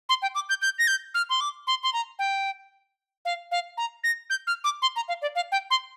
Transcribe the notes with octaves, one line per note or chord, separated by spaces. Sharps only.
C6
G5
D6
G6
G6
A#6
G6
F6
C6
D6
C6
C6
A#5
G5
F5
F5
A#5
A#6
G6
F6
D6
C6
A#5
F5
D5
F5
G5
C6